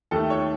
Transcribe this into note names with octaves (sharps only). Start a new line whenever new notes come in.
D#2 D#3 A3 A4
C#5